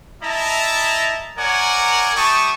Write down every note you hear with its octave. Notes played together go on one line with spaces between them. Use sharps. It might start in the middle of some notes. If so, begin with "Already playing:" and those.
E4 D#5 E5 A5 A#5
A#4 C#5 D5 F#5 G#5 A#5
G3 E4 G5 A5 C#6 D#6